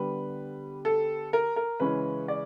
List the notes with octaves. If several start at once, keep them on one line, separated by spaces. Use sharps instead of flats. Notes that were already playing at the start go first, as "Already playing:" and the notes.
Already playing: D3 G3 B3 B4
A4
A#4
A#4
C#3 E3 G#3 C#4 B4
D5